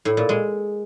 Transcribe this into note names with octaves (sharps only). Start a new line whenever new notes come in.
A2
A#2
G#3